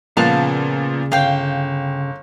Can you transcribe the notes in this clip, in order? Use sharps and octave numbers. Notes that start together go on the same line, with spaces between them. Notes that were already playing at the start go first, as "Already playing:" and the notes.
A#2 C#3 F3 B3 F5 A5 F#6
G1 F5 G5